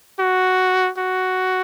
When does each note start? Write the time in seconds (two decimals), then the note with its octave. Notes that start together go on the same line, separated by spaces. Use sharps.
0.20 F#4
0.98 F#4